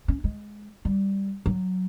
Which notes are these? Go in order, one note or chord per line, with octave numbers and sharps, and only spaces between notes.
C#4
G#3
G3
F#3